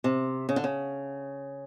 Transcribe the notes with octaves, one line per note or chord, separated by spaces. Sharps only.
C3
C#3
D3
C#3